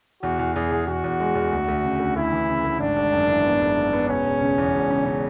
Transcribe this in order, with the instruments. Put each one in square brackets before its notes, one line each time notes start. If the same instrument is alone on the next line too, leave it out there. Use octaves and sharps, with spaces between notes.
[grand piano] E2 [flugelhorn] F#4
[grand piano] E2
[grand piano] E2 [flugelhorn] G#4
[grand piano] E2
[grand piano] E2 [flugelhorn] F#4
[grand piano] E2
G#3
E2
D2
D2
C#3
D2
[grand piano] D2 [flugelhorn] E4
[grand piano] E3
C#3
D2
[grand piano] G#1 [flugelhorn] D4
[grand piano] G#1
F#2
E3
B3
G#1
B3
B3
[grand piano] E1 [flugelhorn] C#4
[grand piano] E1
C#3
E2
E1
C#3
C#3